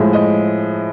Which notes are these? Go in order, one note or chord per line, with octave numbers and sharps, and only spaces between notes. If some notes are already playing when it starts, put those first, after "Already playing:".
Already playing: A2 F3 G#3 E5
D#5